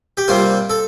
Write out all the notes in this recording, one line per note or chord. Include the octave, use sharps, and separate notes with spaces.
G4
C3 G3 A#3 F4
A4